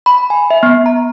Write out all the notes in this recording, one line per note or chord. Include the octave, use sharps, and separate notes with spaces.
B5
G#5
E5
B3
A#5